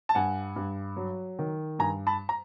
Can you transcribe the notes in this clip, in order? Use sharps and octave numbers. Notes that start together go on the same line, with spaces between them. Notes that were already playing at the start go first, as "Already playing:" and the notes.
A5
G2 F#5 G#5
G2
F#3
D#3
G2 G#5 A#5
A5 B5
A#5